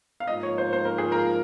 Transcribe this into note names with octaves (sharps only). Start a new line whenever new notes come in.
F5
G#2 F3 A#3 F4 D#5
C#5
C5
C5
A#4
G#4
A#4